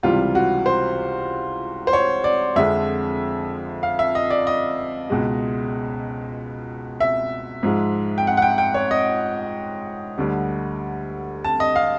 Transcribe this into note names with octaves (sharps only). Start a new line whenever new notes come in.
C#2 C3 E3 G3 F4
F#4
C5
C5
C#5
D5
F2 D3 F3 G#3 E5
F5
E5
D#5
D5
D#5
C#2 B2 G#3
E5
G#2 F3 G#3
G5
F#5
F#5
G5
G5
C#5
D#5
D2 D3 G3
A5
D#5
F5